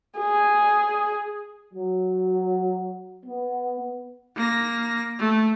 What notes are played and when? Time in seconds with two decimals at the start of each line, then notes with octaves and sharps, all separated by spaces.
0.19 G#4
1.74 F#3
3.26 B3
4.36 A#3 A#6
5.19 A3